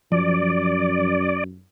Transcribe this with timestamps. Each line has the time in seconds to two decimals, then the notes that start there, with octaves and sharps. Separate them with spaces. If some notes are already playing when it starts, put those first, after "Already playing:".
0.12 F#2 F3 D5